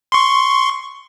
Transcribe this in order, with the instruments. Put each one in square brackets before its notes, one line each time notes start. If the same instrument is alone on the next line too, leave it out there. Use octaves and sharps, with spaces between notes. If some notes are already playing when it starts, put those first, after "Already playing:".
[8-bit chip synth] C6 C#6